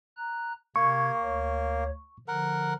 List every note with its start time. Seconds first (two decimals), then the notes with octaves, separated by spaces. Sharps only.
0.17 A#5 F#6
0.76 C3 A#3 C#6 G#6
1.22 D2 C#5
2.28 D3 F3 A#4 F#5